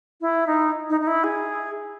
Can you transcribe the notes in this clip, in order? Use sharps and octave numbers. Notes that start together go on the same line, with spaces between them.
E4
D#4
D#4
D#4
E4
G#4